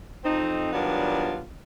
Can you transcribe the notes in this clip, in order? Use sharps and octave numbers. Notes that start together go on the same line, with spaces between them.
F2 C4 D#4
D#3 F#3 G3 B3 D4 F4